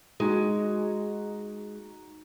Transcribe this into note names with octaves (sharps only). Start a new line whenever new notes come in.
G#3 D#4 F#4